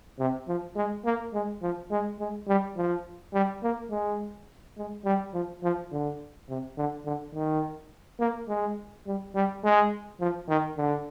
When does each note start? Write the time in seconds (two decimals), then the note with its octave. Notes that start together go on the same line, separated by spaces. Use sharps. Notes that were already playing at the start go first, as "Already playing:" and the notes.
0.19 C3
0.48 F3
0.76 G#3
1.05 A#3
1.33 G#3
1.62 F3
1.91 G#3
2.19 G#3
2.48 G3
2.77 F3
3.34 G3
3.63 A#3
3.91 G#3
4.78 G#3
5.05 G3
5.34 F3
5.63 F3
5.92 D3
6.49 C3
6.78 D3
7.05 D3
7.34 D#3
8.20 A#3
8.48 G#3
9.07 G3
9.35 G3
9.64 G#3
10.20 F3
10.49 D#3
10.77 D3